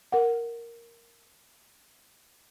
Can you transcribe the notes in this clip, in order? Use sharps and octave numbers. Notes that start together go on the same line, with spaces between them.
A#4 F#5